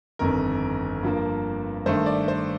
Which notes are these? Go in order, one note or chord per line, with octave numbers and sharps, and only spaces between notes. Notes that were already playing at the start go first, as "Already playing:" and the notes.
G1 F2 D#3 A#4
G2 F3 A#3
G2 D#3 A3 C5
D5
C5